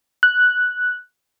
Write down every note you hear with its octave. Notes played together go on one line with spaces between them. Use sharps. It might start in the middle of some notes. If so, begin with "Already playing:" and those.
F#6